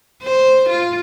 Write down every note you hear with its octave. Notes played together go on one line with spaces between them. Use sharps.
C5
F4